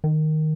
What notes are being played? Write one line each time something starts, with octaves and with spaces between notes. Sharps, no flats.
D#3